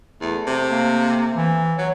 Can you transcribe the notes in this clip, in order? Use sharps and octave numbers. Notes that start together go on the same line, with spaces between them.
E2 A3
C3
A#3
E3
F#3 C#5